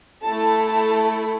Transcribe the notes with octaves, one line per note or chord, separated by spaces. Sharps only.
A3 E4 A4 A5
A5